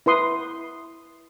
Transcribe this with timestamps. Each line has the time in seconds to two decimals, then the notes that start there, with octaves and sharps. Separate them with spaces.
0.06 E4 B4 C6 D#6